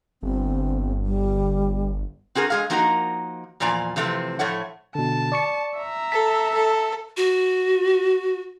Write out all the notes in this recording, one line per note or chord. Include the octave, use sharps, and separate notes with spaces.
G1 C4
G3
C4 F#4 G#4 A#4
G#3 G#4 F5
F3 A#3 D#4 F#4 A#4 A#5
E2 A#2 F3 D5 G#5 A#5
C3 E3 F3 A3 C4
A2 F3 A3 C#5 F#5
B2 D3 A5
D5 C#6 C#7
E5 A#5
A4 B6
A4
F#4